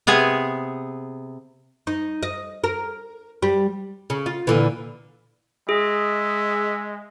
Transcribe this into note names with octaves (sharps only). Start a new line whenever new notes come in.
C3 B3 G#4 G#5
D#4
D#5
A#4
G3
C#3
F4
A#2 D3 E3
G#3 G#4 E5